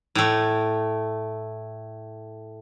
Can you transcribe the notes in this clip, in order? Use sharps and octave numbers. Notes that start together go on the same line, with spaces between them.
A2 A3